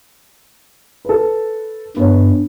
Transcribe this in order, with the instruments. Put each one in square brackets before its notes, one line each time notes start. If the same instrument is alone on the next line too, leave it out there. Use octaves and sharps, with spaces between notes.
[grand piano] A4 B4
[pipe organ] G2 [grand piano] B3 C#5